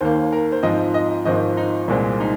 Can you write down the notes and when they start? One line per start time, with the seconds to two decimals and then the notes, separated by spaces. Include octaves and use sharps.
0.01 D#2 D#3 A#3 C5
0.33 A#4
0.52 C5
0.63 G#2 F3 C4 D#5
0.94 D#5
1.25 G#1 G#2 F3 C4 D#5
1.57 D#4
1.88 C2 A#2 G#3 C4
2.20 D#4